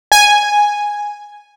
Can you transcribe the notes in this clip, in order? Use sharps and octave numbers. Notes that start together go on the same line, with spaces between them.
G#5